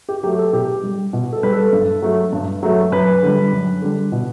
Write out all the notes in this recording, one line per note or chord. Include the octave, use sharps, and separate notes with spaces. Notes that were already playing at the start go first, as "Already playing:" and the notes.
G4
F#3 A3 G4
A4
B2 G4
G3
B2
A4
G3 B4
A4
G2
F#3 A3
G2
F#3 A3
F#2 B4
D3 G3
F#2
D3 G3
B2